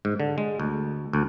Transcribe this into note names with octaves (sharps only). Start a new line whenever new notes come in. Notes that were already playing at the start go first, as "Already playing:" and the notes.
G#2
D3
G#3
D2
D2